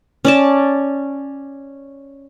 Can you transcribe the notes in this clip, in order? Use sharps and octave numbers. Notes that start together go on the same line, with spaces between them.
C#4 D5 A5